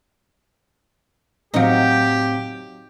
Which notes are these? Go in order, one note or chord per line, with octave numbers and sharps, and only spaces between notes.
A2 F#3 C4 D#4 G4 F5